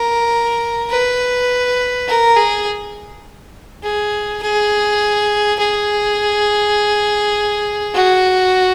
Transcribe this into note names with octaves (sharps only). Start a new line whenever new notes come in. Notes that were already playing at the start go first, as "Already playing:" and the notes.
Already playing: A#4
B4
A#4
G#4
G#4
G#4
G#4
F#4